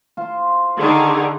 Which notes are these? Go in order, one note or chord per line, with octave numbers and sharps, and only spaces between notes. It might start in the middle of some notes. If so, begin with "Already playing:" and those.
F4 C5
D3 D#3 G#4